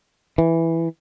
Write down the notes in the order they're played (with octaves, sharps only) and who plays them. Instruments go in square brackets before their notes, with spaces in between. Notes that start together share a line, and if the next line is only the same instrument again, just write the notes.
[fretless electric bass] E3